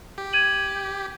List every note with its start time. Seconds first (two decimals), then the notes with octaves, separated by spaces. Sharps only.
0.18 G4
0.33 G#6 D#7 F#7